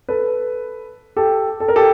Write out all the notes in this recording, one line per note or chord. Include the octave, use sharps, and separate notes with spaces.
A4 B4
G4 A4
A4
A#4
G4 A4